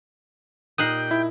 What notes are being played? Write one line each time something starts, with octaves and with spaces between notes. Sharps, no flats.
A#2 D#4 G4 G5 D#6 F#6 C7
E4